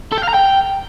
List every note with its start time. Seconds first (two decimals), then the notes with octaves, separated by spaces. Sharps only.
0.12 A4
0.18 G5
0.23 F5
0.29 A#5
0.34 G5